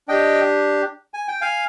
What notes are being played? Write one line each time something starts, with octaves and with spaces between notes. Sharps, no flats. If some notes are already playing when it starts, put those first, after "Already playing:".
D4 G4 D#5 G5
G#5
G5
F5 G#5